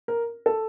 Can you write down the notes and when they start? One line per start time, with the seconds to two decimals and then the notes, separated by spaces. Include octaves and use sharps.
0.08 A#4
0.46 A4